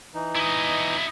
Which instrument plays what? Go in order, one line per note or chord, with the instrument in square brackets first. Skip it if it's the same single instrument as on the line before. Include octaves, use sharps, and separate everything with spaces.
[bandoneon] E3 D#4
[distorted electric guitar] E4 D#5